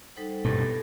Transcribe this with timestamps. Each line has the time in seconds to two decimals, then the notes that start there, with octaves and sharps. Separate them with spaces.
0.16 G3 D#4 A4 C5 F#5
0.44 G2 B2 B3 E4 A4